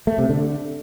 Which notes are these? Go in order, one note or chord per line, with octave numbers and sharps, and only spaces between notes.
A3
C3
D3